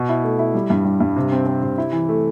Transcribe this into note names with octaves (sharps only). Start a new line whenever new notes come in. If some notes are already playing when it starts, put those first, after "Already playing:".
Already playing: B2
E4
A3
E4
G3
G2
G3
G2
C3
C4
C4
C3
E4
E3
A3